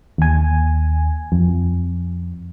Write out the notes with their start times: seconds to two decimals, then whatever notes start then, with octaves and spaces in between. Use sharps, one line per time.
0.18 D#2 G#5
1.32 F2